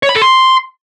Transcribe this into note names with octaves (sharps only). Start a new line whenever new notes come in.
C#5
B5
A4
C6